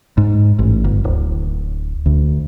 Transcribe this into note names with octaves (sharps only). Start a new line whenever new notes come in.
G#2
A1
G1
D1
D2